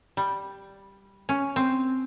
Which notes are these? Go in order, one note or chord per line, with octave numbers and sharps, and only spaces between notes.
G3
C#4
C4